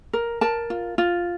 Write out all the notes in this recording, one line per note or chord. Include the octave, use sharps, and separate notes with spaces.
A#4
A#4 A5
F4
F4